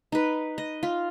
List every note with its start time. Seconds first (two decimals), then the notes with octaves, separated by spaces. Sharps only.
0.12 D#4 B4
0.58 D#5
0.83 F4